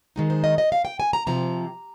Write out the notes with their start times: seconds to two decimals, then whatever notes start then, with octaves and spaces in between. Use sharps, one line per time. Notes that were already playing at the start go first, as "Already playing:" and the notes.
0.16 D#3 G#3 D#4
0.30 C5
0.44 D#5
0.58 D#5
0.72 F5
0.85 G5
1.00 G#5
1.13 A#5
1.27 C3 F3 C4 A#5